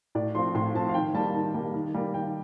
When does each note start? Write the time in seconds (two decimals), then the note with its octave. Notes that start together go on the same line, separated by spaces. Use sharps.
0.15 A2 D5
0.35 F3 C4 C6
0.55 A2 C6
0.74 F3 C4 A5
0.89 F5
0.94 D#3 G5
1.14 G3 A#3 A5
1.34 D#3 A5
1.54 G3 A#3
1.74 D#3
1.94 G3 A#3
2.14 D#3 G5